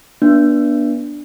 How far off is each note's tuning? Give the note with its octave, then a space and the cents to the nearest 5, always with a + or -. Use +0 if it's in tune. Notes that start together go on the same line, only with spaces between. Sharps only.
B3 -35 D4 +0